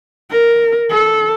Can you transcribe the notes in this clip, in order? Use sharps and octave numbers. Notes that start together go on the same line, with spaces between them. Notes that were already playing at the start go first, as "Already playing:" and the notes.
A#4
A4